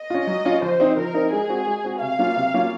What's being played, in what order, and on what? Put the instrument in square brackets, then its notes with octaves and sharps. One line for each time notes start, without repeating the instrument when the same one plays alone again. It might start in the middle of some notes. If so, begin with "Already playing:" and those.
Already playing: [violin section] D#5
[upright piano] C#4 F4
F#3
C#4 F4
[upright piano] F3 [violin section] C5
[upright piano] C4 D#4
[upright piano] F3 [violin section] A#4
[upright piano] C4 D#4
[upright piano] G#3 [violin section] G#4
[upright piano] C4 F#4
G#3
C4 F#4
[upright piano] C3 [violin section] F5
[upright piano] F#3 A#3 C#4 F4
C3
F#3 A#3 C#4 F4